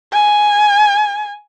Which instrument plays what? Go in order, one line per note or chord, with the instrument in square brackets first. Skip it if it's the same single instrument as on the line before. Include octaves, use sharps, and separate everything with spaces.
[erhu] G#5